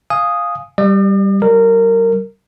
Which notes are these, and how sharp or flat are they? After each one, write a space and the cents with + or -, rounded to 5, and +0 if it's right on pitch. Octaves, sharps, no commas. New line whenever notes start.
F5 +0 G#5 +0 D#6 +0
G3 +0 D5 +45
G3 -45 A#4 -20